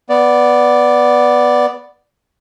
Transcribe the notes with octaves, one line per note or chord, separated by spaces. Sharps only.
B3 D5